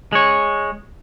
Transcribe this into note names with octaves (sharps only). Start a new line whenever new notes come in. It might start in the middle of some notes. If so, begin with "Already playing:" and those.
G#3 C#5